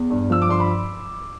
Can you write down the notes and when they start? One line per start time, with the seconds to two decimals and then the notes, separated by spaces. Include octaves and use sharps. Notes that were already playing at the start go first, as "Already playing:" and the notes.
Already playing: E2
0.10 G2
0.30 F3 E6
0.42 D6
0.49 G2 C6
0.60 B5